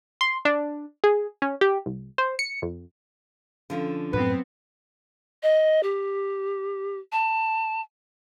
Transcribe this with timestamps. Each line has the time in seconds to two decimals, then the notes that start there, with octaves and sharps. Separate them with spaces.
0.21 C6
0.45 D4
1.04 G#4
1.42 C#4
1.61 G4
1.86 C2
2.18 C5
2.39 C#7
2.62 F2
3.70 D3 F3 C#4
4.13 F#2 A2 B3 C4 B4
5.43 D#5
5.83 G4
7.12 A5